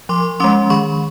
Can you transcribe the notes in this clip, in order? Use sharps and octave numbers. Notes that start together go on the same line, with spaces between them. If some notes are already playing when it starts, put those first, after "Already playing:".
F3 C6 D6
G#3 C#4 C6 D6
D#3 B5 C#6